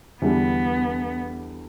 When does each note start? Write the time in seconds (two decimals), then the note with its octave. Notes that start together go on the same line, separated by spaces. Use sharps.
0.22 E2 D3 G3 B3 D4